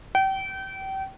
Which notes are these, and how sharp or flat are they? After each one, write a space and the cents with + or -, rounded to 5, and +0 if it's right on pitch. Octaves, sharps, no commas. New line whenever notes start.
G5 -30